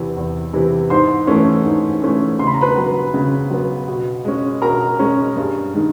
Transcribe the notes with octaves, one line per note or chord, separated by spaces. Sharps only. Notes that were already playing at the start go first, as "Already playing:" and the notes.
Already playing: E2 C3 E3
E2
C3 E3
G#2 C5 C6
E3 A3 C#4
G#2
E3 A3 C#4
C#3 C6
B5
A#5
B4 B5
F#3 B3
C#3
F#3 B3
B2
G#3 C#4
B2 A#4 A#5
G#3 C#4
G2
D#3 G#3